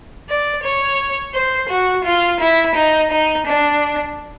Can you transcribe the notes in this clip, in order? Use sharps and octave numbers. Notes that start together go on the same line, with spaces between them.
D5
C#5
C5
F#4
F4
E4
D#4
D#4
D4